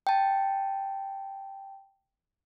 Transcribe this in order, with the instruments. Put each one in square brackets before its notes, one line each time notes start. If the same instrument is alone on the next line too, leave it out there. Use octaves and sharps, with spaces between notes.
[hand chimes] G5 A5